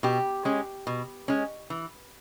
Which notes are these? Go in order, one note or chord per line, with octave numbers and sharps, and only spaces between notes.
B2 G4
G#3 C#4
B2
G#3 C#4
E3